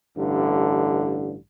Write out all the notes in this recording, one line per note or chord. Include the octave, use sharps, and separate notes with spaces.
A1 G2 D3